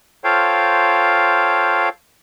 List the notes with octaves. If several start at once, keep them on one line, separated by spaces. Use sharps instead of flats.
F4 A4 C5 C#5 F5 G5